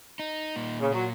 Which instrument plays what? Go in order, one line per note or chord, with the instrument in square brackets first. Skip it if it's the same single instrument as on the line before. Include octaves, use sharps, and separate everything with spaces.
[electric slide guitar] D#4
A#2
[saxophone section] C#3
[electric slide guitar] A#2 [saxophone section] F#3